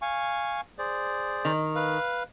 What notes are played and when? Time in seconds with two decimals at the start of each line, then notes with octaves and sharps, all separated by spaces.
0.02 F5 G#5 C#6
0.78 G#4 C5 D5
1.45 D#3
1.75 B4 F5